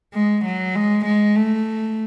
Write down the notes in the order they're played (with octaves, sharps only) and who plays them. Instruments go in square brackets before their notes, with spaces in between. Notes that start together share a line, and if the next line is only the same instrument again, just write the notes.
[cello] G#3
F#3
G#3
G#3
A3